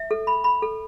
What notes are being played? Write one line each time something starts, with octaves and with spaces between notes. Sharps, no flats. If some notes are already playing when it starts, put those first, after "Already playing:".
Already playing: E5
A4
B5
B5
A4